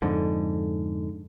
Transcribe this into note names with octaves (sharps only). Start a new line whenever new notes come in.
F2 G#2 D3